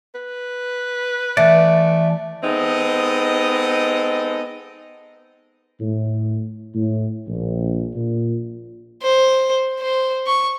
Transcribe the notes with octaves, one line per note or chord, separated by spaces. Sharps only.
B4
E3 A3 D5
G#3 B3 C4 D#4 A4 D#5
A2
A2
A#1
A#2
C5
C5
C#6